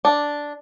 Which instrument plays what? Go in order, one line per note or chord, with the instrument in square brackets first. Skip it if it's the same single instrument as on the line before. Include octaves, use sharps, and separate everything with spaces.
[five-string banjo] D4